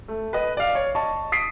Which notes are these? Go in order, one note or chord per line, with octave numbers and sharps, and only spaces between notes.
A3
B4 D#5
D5 F5
C#5
D#5 A5 C#6
D#6 B6 C7 D7